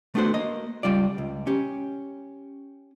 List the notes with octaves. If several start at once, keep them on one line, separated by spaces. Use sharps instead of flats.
A3 B3 D4 F#4 C5
A#3 D#5
C#2 G3 F4 D5
C#2
C#4 G4